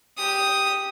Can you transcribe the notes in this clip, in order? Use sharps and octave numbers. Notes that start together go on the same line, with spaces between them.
G4 D#6